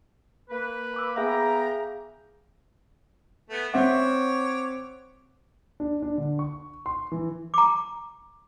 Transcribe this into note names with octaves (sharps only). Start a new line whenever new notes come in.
A#3 B4
B5 D6 E6
B3 G#4 E5 F5 G5 A#5
A3 B3
C4 C#5 E5 F#5 D6
D4
D4
D3
C#6
C6
E3
A#5 D6